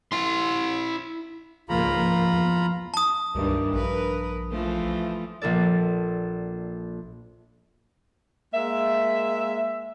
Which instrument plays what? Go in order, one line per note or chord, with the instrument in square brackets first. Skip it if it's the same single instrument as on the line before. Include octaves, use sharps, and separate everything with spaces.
[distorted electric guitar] E4 C6
[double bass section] C#2 G#2 A#3 [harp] F3 [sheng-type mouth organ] F4 A#5 B5
[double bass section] E2
[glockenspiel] A5 D#6
[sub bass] C#2 [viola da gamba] G2 D#3 E3
[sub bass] A#1 [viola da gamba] A#4 B4
[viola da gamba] E3 F3 A3
[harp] A#1 A#3 A4 D5
[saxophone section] G#3 A#3 E5